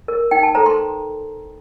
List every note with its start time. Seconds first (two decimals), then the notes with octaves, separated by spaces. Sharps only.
0.08 A#4
0.31 D#4 G5
0.43 A5
0.55 A4 C5 A#5
0.66 C6